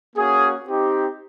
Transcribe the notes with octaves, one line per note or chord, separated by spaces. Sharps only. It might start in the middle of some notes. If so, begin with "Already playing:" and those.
A#3 C#4 F#4 G#4
C4 D#4 G4